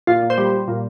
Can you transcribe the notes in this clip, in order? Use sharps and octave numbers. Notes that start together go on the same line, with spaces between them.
A#2 F4
A#2
C5
G3
G3
A#2